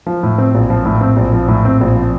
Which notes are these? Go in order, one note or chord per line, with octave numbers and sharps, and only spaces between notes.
F3
A2
C4
A#1
F3
A2
C4
A#1
F3
A2
C4
A#1
F3